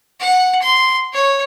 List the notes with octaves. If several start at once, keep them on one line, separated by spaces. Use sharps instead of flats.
F#5
C6
C#5